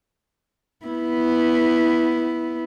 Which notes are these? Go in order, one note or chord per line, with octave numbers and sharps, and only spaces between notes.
B3 E4